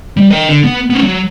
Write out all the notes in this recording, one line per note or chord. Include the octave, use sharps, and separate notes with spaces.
G3
D#5 G5
D3
B3
B3 C#4
F#3